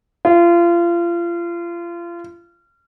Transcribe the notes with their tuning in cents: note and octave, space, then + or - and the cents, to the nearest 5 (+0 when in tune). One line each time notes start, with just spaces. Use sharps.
F4 -30